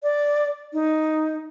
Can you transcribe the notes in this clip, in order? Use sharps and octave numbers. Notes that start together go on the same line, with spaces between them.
D5
D#4